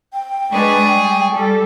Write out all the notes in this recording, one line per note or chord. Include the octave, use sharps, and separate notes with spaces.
G5
G#3 D4 G#4 B4 C#6
G3
G3 A4